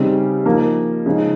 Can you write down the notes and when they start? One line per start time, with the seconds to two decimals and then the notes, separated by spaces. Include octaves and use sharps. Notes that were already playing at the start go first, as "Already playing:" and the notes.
Already playing: C#3 G3 C4 D#4
0.46 F3 A#3 D#4
1.06 C#3 F3 G#3 D#4